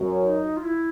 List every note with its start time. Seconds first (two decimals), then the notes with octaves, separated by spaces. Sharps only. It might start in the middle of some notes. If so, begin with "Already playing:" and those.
Already playing: F#2
0.22 D#4
0.57 F4
0.64 E4